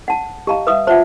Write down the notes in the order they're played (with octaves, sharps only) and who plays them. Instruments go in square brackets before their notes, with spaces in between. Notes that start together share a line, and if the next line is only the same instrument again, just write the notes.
[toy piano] F#5 A5
[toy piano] G4 A5 A#5 [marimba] D#5 F5
[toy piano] B4 D#6 [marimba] E5 F5
[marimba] F4 E5 A5 [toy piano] C5 F#5